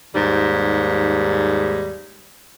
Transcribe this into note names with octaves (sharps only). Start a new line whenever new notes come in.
D#2 G#2 G3